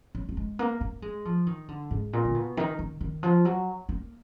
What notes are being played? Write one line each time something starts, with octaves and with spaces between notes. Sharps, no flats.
F#3
F#3
G#3
A#3
A#3
G#3
F3
D#3
D3
G#2
A#2
D3
B2
D#3
D#3
D#3
F3
F#3
A#3